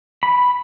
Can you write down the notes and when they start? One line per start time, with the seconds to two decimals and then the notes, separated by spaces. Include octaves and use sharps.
0.23 B5